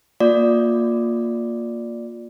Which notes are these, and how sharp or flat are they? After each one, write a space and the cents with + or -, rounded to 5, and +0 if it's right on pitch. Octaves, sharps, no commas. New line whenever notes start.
A#3 +0 F4 +25 D5 +0